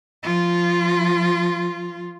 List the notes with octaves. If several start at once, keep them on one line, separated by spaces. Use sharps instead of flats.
F3 F4